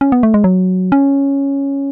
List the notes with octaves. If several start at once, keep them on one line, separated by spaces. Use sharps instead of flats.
C#4
B3
A3
G#3
F#3
C#4